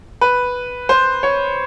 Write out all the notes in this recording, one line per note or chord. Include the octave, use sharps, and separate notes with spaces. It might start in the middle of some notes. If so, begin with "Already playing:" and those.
B4
C5
C#5